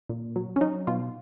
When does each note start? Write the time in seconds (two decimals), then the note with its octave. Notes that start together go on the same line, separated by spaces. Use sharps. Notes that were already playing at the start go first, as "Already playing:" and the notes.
0.09 A#2
0.36 F#3
0.56 C#4
0.61 F#3 D#4
0.87 B2 F4